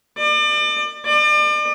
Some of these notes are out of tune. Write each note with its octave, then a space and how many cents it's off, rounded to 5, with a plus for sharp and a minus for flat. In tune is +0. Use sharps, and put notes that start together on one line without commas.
D5 +35
D5 +40